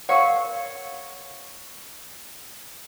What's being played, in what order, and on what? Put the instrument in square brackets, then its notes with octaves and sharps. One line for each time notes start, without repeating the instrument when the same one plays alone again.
[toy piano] A#4 F5 F#5 [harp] C#5 C#6